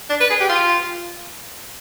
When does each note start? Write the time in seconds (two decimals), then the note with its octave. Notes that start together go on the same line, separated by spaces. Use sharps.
0.10 D4
0.21 B4
0.30 G#4
0.40 G4
0.50 F4